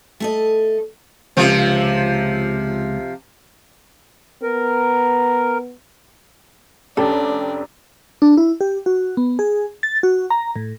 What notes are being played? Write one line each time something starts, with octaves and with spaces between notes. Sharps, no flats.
A3 A4 D#5
C#2 C3 F3
B3 A#4
F1 C#4 D4 G4 A4
D4
E4
G4
F#4
B3
G#4
A6
F#4
A#5
A2